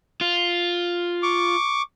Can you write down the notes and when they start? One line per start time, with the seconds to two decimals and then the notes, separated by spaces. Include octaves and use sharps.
0.21 F4
1.23 C#6 D6